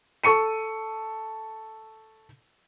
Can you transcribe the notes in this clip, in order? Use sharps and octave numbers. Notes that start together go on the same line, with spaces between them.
A4 C#6 C#7 D#7